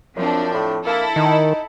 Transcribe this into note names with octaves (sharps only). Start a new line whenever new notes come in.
F#2 F3 C4 D4
A2
A#3 E4 A4
D#3 D#4